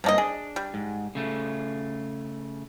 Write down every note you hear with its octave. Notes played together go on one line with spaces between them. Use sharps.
G2 C3 A#3 D4 D#5
D4 G#4
G3
G#2
C#3 A3